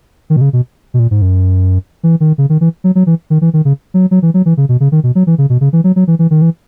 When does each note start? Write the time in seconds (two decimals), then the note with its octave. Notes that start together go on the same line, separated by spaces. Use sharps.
0.30 D#3
0.36 B2
0.41 C#3
0.53 B2
0.94 B2
0.99 A#2
1.11 G#2
1.22 F#2
2.03 E3
2.20 D#3
2.38 C#3
2.49 D#3
2.61 E3
2.84 F#3
2.95 F#3
3.07 E3
3.30 D#3
3.41 E3
3.53 D#3
3.65 C#3
3.94 F#3
4.11 F#3
4.22 E3
4.34 F#3
4.46 E3
4.57 C#3
4.69 B2
4.80 C#3
4.92 D#3
5.03 B2
5.15 F#3
5.27 E3
5.38 C#3
5.50 B2
5.61 C#3
5.73 E3
5.84 F#3
5.96 F#3
6.07 E3
6.19 E3
6.31 D#3
6.42 E3